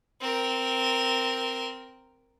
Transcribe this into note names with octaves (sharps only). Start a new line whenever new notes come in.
C4 A#4